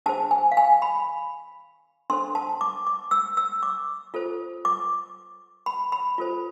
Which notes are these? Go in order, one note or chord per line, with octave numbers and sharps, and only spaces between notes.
D4 G#4 C5 A5
G#5
F5
G#5
B5
D4 A4 C5 C6
A5
D6
D6
E6
E6
D6
F4 A4 C5
D6
B5
B5
F4 A4 C5